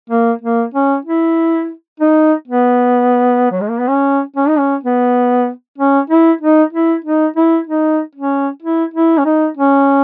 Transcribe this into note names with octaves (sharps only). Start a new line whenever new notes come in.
A#3
A#3
C#4
E4
D#4
B3
F#3
G#3
A#3
B3
C#4
C#4
D#4
C#4
B3
C#4
E4
D#4
E4
D#4
E4
D#4
C#4
E4
E4
C#4
D#4
C#4